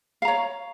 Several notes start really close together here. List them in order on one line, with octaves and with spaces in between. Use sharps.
F5 A#5 C#5